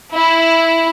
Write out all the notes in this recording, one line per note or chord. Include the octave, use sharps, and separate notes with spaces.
E4